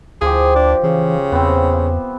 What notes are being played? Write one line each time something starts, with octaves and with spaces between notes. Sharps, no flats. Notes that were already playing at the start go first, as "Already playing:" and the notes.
D2 F3 G4 G#4
D4
C#3 E3
E2 B3 C4